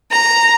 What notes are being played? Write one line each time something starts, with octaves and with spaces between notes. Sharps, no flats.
A#5